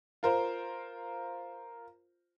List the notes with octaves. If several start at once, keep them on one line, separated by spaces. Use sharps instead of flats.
F4 A#4 C5